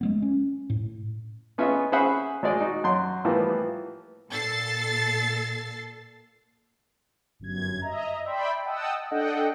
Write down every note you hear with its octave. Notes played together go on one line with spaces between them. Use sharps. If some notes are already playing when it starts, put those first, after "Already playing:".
G#3 A3 B3
C#4
A2
B3 C#4 F4 G#4 D#5 E5
C#4 G#4 C5 E5 F#5 B5
G#1 G#3 D5 D#5
D#4 F#4
F#2 C6
A2 E3 F3 G3 A#3 B3
A#2 A4 A6 C7
G1 F#2 G#6
D#5 E5 A#5
D5 E5 G5 B5 C6
D#5 F#5 G5 A5 D#6 E6
D4 A4 D#5 F#5 G5